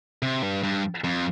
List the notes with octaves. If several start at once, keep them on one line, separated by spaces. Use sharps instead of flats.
C3
G2
G2
F2